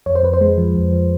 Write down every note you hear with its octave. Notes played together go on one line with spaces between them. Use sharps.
F2 C#5
C5
F2 B4
C5
G#3
F3
F2
F3